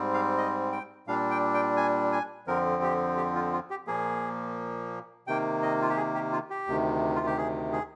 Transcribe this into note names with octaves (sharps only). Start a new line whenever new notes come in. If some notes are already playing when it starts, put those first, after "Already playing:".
Already playing: G#2 G3 C4
F5
D#5
G5
A#2 G3 D4 F5
G5
G5
G#5
G#5
F2 D3 F3 C4 A#4
G4
G4
F4
F4
G4
A#2 F3 A#3 G#4
C3 D#3 A#3 G5
D#5
F4
G4
G#4
G4
F4
G4
D2 C3 D#3
F4
G4
G#4
G#4